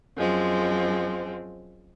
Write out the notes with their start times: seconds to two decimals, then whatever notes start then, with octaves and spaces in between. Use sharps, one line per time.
0.17 F#2 F3 G#3 C4